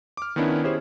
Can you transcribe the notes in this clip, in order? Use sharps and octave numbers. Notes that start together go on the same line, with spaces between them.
D6 F6
D#3 B3 C#4 D4 E4
C#4 E4 G4 G#4 C5 C#5